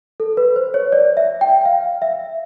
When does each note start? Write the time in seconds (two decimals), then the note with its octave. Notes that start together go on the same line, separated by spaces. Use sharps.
0.20 A4
0.37 B4
0.56 C5
0.74 C#5
0.92 D5
1.17 E5
1.41 G5
1.65 F5
2.02 E5